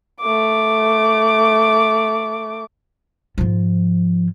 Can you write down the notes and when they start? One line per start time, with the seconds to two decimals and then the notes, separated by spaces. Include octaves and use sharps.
0.21 A3 D6
3.38 G#2 F3